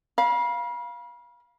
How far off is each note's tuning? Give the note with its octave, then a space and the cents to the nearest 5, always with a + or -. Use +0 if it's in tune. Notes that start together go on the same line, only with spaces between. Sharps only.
F5 +0 B5 -35